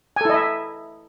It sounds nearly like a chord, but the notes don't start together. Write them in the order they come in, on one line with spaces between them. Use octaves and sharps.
G#5 A4 E4 D#5 E5